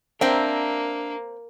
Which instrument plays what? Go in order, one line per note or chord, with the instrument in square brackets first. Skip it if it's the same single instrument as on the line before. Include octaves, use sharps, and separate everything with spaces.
[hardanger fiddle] A#3 [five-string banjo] C4 G5 [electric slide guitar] D4 [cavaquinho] E5 A#5